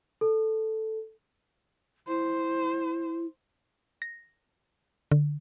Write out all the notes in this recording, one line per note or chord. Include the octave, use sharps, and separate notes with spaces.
A4
E4 C5
A#6
D3